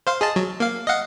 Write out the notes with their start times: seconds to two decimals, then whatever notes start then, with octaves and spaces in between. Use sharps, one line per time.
0.07 C5 F5 C6
0.21 G#4 D#5 A5
0.36 F#3
0.60 A#3 F5
0.87 D#5 F5 F#5